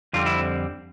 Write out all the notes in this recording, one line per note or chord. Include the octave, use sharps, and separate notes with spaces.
F2 D3 G3 C4 F4
E4